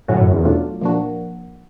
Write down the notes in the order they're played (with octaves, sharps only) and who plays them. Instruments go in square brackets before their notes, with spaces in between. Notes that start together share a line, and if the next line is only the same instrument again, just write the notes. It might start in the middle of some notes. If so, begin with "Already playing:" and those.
[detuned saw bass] A2 [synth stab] D3 F#3 A3 C#4 F#4
[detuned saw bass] F#2
E2
[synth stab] B2 F#3 A3 D4 F4
A#2 F3 A#3 D4 F#4